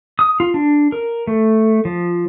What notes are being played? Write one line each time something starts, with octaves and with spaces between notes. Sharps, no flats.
D#6
F4
D4
A#4
A3
F3